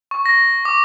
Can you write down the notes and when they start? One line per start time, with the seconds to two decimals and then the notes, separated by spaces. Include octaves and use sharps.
0.11 C#6
0.26 A#6
0.65 D6